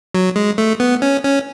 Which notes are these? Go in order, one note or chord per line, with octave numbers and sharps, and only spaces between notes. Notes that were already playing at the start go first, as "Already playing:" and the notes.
F#3
G#3
A3
B3
C#4
C#4